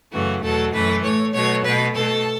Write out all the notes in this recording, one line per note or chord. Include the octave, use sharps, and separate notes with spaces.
F#2 C#3 E3 A3 F#4
E2 B2 F#3 A3 A4
F#2 E3 A3 B4
A2 A3 C#5
B2 F#3 A3 C#5
B2 A3 B4
B2 A3 A4